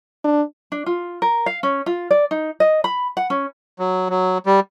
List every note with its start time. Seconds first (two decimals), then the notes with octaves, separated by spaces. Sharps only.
0.24 D4
0.72 D4
0.86 F4
1.22 A#4
1.46 F5
1.63 C#4
1.86 F4
2.11 D5
2.31 D#4
2.60 D#5
2.84 B5
3.17 F#5
3.30 C#4
3.79 F#3
4.10 F#3
4.46 G3